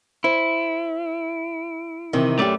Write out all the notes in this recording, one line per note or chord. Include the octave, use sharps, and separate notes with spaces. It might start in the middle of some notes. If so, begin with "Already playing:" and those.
E4 C5
C3 D#3 E3
F#2 A3 G4 D5